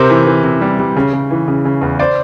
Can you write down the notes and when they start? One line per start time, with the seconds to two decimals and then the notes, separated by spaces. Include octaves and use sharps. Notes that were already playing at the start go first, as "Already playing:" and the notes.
Already playing: C3 A#4 C5
0.10 E3
0.26 E3
0.44 C3
0.61 G3
0.79 G3
0.96 C#3
1.13 C#3
1.31 E3
1.48 C#3
1.65 C#3
1.81 E2
1.99 C5 D5